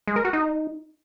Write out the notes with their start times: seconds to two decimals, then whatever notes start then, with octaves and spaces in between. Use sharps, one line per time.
0.07 G#3
0.16 A#4
0.25 F#4
0.33 D#4